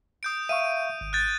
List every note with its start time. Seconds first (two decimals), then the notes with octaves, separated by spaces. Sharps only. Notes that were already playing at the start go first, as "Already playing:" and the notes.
0.23 D#6 G6 D7
0.49 E5 F5 C#6 D#7
1.01 G#1
1.13 F#6 G6 A6